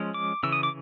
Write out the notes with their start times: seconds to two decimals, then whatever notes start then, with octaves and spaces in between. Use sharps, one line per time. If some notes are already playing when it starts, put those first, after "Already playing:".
Already playing: F3 G#3 C#4
0.14 D6
0.43 C#3 E3 E6
0.52 D#6
0.63 D6